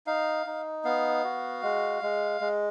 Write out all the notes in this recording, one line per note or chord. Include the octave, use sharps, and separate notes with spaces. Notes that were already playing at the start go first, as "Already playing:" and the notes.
D#4 F5
D#4
B3 F5
F#4
G#3
G#3
G#3